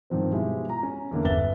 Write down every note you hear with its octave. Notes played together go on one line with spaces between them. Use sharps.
G2 D#3 F3 C4
B2 F3 G#3 E4 G4
A#5
C#4
E2 D3 A#3
G1 B4 E5 A6 G7